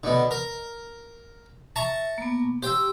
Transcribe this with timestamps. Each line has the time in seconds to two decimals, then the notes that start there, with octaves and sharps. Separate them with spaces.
0.04 B2 D3
0.31 A#4
1.76 E5 A5 A#5 C#6
2.18 A#3 B3
2.63 G4 C5 G5 E6